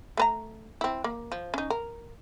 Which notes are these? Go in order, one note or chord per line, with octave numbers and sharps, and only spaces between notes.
A3 B4 A#5
C4 E4
A#3
F3
C#4 D#4
A#4